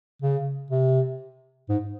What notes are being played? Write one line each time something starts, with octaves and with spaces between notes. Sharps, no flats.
C#3
C3
G#2